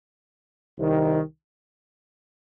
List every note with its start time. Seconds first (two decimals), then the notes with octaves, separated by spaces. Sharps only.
0.77 C2 C3 D#3